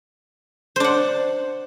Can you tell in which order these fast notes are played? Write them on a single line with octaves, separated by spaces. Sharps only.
C5 D4 F#5